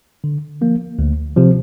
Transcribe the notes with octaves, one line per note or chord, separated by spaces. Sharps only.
D3
F3 A#3
D2
C3 F3